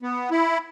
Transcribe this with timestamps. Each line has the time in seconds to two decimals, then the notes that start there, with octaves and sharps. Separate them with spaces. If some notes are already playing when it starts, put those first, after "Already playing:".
0.02 B3
0.31 E4